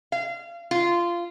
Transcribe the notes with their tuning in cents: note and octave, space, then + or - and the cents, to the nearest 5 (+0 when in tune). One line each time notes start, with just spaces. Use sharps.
F5 -30
F4 -15